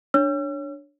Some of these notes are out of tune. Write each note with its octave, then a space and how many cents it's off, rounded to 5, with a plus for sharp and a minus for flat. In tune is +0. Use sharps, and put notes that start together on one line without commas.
D4 +0 C#5 +0 E6 +45